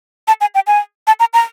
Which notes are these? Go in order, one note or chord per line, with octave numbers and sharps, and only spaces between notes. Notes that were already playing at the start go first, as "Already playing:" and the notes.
A5
G#5
G5
G#5
A5
A#5
A#5